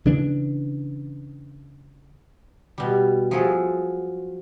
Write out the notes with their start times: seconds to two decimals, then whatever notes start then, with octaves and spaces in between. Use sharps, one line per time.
0.05 C#3 E3 D4
2.78 B2 G3
3.31 F3 F#3 G#4 A4